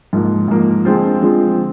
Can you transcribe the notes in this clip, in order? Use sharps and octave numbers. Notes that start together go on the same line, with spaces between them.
G#2 F3 A#3
G#2 F3 A#3
D3 F3 G#3 C4 F4
D3 F3 G#3 C4 F4